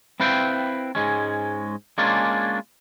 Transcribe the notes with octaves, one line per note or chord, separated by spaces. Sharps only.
C4 E4 B4 F5 G5
G#2 G#3 C#4
G#3 A#3 C#4 D4 F4